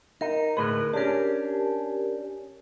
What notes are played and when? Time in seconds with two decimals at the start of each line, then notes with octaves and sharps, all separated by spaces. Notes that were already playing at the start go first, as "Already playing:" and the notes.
0.21 D#4 A#4
0.57 D2 A2 G#4 A#4 B4
0.94 C#4 D4 G4 A#4